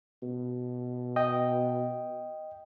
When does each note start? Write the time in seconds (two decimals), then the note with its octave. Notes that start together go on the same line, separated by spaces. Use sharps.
0.22 B2
1.16 D#5 G5